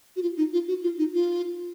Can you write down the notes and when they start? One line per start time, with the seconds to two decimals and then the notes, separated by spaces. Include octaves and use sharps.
0.16 F#4
0.22 F4
0.37 D#4
0.53 F4
0.68 F#4
0.83 F4
0.98 D#4
1.14 F4